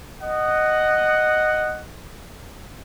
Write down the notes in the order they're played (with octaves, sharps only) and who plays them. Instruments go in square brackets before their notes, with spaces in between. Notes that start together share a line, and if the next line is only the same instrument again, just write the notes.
[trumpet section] D#5 F#5